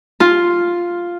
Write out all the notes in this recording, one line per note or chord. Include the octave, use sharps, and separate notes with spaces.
F4